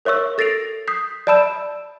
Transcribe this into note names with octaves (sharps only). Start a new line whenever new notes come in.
A#4 C#5 E5 C#6 E6
A4 A6 A#6 C7 D7 F7
D#6 G6 B6 C7
D5 E5 A5 B5 E6 E7